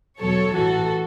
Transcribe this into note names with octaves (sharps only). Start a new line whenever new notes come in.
E2 B2 F#3 A4 C#5
A1 A2 E3 F#4 A4